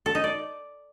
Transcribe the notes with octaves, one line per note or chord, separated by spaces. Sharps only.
A4
D#4
D5